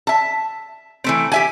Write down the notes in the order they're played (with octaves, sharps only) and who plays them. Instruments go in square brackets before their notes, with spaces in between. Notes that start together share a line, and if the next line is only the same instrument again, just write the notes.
[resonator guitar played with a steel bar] E5 A5
E3 A3 C4
G4 E5 G#5